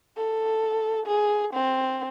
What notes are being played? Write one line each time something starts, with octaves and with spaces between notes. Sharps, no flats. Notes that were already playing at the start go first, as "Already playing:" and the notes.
A4
G#4
C4